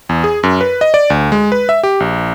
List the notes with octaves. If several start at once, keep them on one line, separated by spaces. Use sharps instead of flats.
E2
G#4
F#2
B4
D#5
D5
D2
G#3
B4
E5
G4
A#1